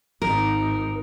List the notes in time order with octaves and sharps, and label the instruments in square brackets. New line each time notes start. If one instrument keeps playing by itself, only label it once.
[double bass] G#1 D#4 [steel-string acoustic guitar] A#4